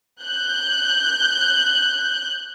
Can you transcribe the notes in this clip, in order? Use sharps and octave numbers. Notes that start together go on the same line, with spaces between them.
F#6 G6